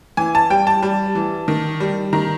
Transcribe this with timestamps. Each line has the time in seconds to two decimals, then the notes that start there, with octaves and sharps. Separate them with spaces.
0.17 E3 G#5
0.35 A5
0.50 G3 G5
0.67 A5
0.82 G3
1.15 E3
1.48 D#3
1.80 G3
2.13 D#3 A#5